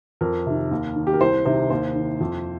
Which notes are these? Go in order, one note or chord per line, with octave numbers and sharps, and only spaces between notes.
F2 A#4
C3 D#3
D#2
D#3
G4
A#4
C2 C5
C3 D#3 C5
D#2 C5
D#3
F2